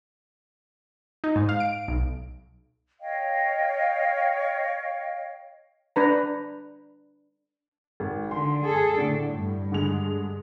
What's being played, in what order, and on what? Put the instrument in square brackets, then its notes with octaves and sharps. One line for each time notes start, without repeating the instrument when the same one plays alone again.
[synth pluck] D#4
G#2
F5
D7
B1
[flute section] C#5 D#5 F5 G5
[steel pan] D4 B4 A#5
[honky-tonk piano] G#1
[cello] D3 [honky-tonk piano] C6
[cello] G#4 A4
[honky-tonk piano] A2 D3 [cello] D4
[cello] G2
[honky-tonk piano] D3 G#3 F7